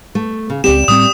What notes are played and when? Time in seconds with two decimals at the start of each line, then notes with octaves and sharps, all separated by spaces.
0.15 A3
0.50 C#3
0.64 C#2 C4 G4 D5 E7
0.88 A2 G3 C4 D#6